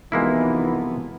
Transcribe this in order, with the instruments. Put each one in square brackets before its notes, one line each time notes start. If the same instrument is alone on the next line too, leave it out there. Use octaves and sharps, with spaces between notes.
[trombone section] B1 E3 [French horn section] C3 F3 B3 [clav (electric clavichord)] G#3 A#3 E4